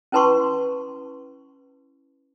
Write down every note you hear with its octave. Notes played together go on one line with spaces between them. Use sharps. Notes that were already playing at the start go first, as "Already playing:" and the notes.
C#4 E4 B4 A5 C6 C#6